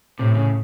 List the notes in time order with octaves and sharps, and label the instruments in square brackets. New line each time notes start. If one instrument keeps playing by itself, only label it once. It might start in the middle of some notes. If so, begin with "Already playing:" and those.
[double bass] A2 [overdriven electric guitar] C3
[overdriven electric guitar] C#3